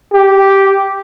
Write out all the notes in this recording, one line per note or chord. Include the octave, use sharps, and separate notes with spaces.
G4